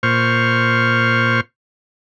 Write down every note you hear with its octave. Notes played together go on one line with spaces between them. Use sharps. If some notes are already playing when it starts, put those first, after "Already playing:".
A#2 C5 C#6 F6